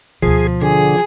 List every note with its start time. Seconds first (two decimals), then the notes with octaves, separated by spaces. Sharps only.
0.22 D2 B2 F3 G#4
0.62 D3 G#4